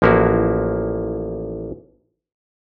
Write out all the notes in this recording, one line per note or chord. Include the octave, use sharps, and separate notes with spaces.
A1 F3 A#3 E4 F#4